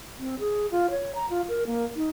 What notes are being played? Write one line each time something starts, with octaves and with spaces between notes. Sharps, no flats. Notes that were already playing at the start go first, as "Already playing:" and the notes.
C4
G#4
F4
C#5
A#5
F4
A#4
A#3
D#4